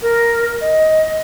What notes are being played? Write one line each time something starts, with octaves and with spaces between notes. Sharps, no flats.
A#4
D#5